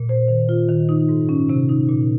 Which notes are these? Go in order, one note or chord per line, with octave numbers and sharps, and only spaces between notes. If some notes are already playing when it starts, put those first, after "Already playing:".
Already playing: A#2
C5
D#3
F4
D#3
D#4
G#2
C#4
C3
D#4
A#2